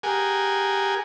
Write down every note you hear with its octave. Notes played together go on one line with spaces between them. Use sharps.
G4 G#4 A#4 F#5 G#5